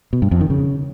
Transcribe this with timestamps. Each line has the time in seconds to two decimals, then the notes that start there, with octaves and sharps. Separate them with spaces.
0.13 B2
0.22 G2
0.31 F2
0.41 D#3
0.50 C#3